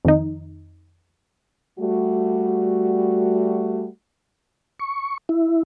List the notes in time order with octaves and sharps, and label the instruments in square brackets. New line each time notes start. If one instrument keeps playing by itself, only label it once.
[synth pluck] F2 D#3 D#4
[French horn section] G3 A3 F#4
[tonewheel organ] C#6
E4